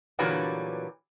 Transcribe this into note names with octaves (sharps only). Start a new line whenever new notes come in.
A#2 D3 E3 F#3 G3 B3